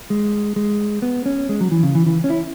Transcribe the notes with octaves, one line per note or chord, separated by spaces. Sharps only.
G#3
G#3
B3
C#4
G#3
F#3
E3
C#3
E3
E3
C#4
E4